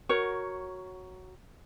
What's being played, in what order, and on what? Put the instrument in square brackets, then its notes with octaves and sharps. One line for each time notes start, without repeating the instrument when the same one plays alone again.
[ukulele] F#4 A#4 C#5